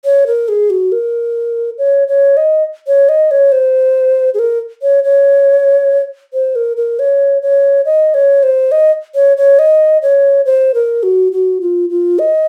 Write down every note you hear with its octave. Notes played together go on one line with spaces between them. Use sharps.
C#5
A#4
G#4
F#4
A#4
C#5
C#5
D#5
C#5
D#5
C#5
C5
G#4
A#4
C#5
C#5
C5
A#4
A#4
C#5
C#5
D#5
C#5
C5
D#5
C#5
C#5
D#5
C#5
C5
A#4
F#4
F#4
F4
F4
D#5